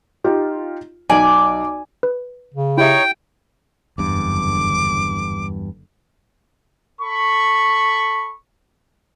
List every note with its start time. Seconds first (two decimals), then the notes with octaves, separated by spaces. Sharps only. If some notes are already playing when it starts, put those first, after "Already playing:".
0.24 D#4 F4 G4
1.10 B1 D5 G#5
2.03 B4
2.54 C#3
2.78 D#4 E4 G4 C#5 E5 G5 C#6
3.98 F#1 E2 G2 D3 D6
7.00 A4 B5 C#6